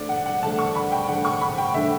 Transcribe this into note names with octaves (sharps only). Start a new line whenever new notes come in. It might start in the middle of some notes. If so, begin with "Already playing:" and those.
Already playing: D3 A3 D4 D5
F#5
F#5
D3 A3 D4 A5
C#6
B5
G5
D3 A3 D4 F#5
C#6
B5
G5
D3 A3 D4 E5